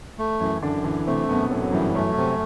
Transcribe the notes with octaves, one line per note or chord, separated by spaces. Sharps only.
A3
F#2 E3 E4
F#2 D3 D4
D3 E3 D4
C3 A3 C4
F#2 B2 B3
F#2 A2 A3
F#3
G2 E3 G3
F#2 F#3 A3
C3